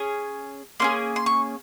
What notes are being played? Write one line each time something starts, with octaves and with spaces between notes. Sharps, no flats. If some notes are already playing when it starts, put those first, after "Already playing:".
Already playing: C#4 G#4
A#3 C#4 G#4 C6
C6
C#6